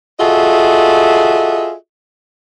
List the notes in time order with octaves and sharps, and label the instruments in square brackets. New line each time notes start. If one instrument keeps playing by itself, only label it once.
[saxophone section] F4 F#4 G#4 A4 D#5 E5